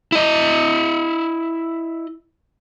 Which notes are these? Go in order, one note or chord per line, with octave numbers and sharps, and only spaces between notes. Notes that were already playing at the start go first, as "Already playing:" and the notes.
E4 D#5